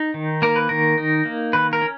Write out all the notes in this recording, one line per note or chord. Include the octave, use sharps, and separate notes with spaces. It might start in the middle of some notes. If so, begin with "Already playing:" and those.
Already playing: D#4
D#3
A#3 A#4
B4
D#3 A#4
D#4
A#3
D#3 B4
A#4
C#4